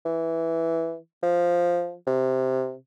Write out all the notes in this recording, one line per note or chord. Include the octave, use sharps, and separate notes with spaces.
E3
F3
C3